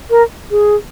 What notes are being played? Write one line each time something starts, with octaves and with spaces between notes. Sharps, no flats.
A#4
G#4